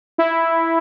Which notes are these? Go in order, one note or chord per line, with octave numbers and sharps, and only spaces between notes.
E4